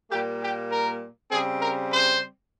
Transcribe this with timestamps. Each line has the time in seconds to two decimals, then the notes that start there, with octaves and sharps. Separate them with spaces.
0.10 A#2 G3 A#3 G4
0.41 G4
0.71 A#4
1.30 C#3 G3 C4 G#4
1.60 A#4
1.91 C5